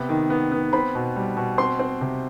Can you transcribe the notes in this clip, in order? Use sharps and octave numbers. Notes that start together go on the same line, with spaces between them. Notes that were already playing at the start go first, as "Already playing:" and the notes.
Already playing: C3 B3
D#3
B3
B3
C4 B5
B2
G3
B2
C4 C6
C4
C3